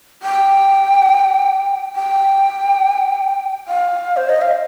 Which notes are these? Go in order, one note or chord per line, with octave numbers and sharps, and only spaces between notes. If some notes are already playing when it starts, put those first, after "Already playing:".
G5
G5
F5
C5
D#5
F5